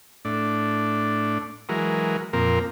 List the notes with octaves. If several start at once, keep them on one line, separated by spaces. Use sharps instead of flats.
A2 D4
E3 F#3 G#3 A#4
F2 A#2 C4 A#4